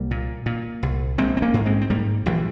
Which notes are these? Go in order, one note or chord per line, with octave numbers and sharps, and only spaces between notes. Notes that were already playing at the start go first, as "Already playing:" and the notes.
Already playing: C2 G3 A#3
A#2
A#2
C2
A#1 G#3 C4
C4
A#3 C#4
G#2
G#3 C4
C4
G#2 G3 A#3
A#1 E3 G3